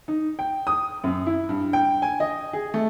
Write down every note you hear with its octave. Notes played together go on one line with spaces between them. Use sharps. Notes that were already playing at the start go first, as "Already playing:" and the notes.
D#4
G5
D#6
F#2
E4
G2
G5
G#5
D#5
G#4
A3